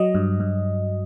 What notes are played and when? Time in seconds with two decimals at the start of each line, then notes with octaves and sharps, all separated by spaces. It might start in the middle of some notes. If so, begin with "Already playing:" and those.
Already playing: F#3 D#5
0.15 G2
0.40 G2